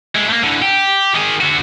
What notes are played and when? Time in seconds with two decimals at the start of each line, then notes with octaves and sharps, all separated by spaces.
0.16 G#3 E4
0.29 A3 A#3
0.43 D3 E3
0.62 G4
1.14 D#3 G#4
1.40 D3 F#4